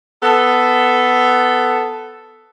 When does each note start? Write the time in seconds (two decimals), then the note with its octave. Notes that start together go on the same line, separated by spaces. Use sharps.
0.22 B3 A4